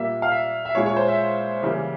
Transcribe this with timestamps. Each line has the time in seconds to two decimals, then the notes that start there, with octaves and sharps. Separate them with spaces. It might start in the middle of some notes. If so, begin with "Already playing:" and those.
Already playing: A#2 G3 A#3 E5
0.22 F5
0.31 E5
0.65 E5
0.75 A#2 G#3 C#4 E4 C#5
0.86 C#5
0.97 C5
1.08 E5
1.63 C#3 E3 G3 A#3